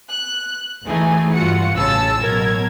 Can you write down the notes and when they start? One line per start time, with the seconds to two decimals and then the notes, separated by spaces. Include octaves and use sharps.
0.11 F#6
0.85 D2 E3 A3 D#4 G#4 G#5
1.34 G2 F4 F#4 F#5 C#7
1.74 A1 C#3 A5 E6 A6
2.19 A1 B2 F#3 A#4 G#6